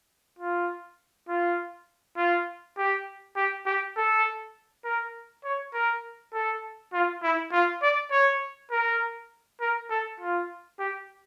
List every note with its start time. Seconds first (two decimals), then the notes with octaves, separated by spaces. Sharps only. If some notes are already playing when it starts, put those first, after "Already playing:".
0.39 F4
1.28 F4
2.17 F4
2.77 G4
3.36 G4
3.66 G4
3.96 A4
4.84 A#4
5.44 C#5
5.74 A#4
6.34 A4
6.93 F4
7.23 E4
7.52 F4
7.82 D5
8.11 C#5
8.71 A#4
9.61 A#4
9.90 A4
10.20 F4
10.79 G4